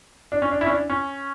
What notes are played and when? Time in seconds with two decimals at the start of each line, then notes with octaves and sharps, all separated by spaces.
0.32 D4
0.42 C#4
0.51 D4
0.61 E4
0.66 C#4
0.70 D4
0.90 C#4